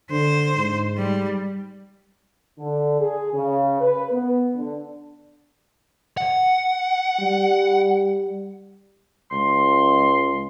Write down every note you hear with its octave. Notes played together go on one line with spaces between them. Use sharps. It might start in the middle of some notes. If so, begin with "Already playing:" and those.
D3 C5
G#2
G3
D3
G#4
C#3
B4
B3
D3
F#5
G3
C#2 C6